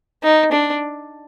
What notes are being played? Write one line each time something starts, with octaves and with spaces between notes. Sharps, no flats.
D#4
D4